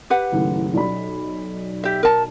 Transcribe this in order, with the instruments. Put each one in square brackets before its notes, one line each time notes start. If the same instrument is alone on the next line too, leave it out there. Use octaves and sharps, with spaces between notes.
[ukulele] G4 B4 F#5
[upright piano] F#1 D#2 A2
B1 D5 B5
[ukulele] G4 E5
A#4 A5